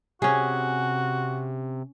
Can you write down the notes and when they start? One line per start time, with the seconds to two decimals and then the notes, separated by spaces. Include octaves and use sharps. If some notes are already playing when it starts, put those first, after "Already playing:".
0.22 C3 C#4 F#4 G#4